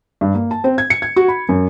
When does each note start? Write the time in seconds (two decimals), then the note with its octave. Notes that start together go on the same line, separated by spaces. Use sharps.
0.21 G2
0.34 A#3
0.51 A5
0.64 C4
0.78 G#6
0.90 C#7
1.02 G#6
1.16 F#4
1.28 B5
1.49 F#2